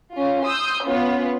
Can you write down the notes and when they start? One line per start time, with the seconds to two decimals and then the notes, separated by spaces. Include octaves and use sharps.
0.12 C#4 F4
0.44 C6 D#6 E6 G6
0.85 B3 C#4 F4 B4